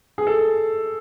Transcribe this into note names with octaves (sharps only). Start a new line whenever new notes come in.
G#4
A4